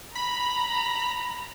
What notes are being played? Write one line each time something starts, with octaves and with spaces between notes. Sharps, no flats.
A#5 B5